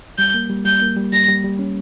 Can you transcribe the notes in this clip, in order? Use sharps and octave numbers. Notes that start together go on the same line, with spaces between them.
G3 G6
A#3
G3
G3 G6
A#3
G3
G3 A#6
G3
G3
C#4